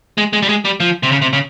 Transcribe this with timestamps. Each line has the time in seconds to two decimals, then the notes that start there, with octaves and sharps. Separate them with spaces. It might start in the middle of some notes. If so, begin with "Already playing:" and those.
0.18 G#3
0.33 G#3
0.42 G3
0.49 G#3
0.65 G3
0.80 F3
1.03 C3
1.12 C#3
1.22 C3
1.33 C#3